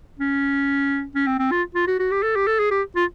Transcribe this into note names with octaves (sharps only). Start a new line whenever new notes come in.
C#4
C#4
C4
C4
F4
F4
F#4
F#4
G4
A4
G4
A4
G#4
G4
F4